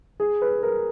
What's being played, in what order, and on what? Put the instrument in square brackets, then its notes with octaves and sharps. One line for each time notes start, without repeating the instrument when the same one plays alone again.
[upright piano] G#4
B4
A#4